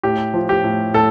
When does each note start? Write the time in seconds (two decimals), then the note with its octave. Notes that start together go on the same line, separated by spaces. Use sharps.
0.03 A2 G4
0.34 F3
0.49 G4
0.64 A2
0.94 A2 A4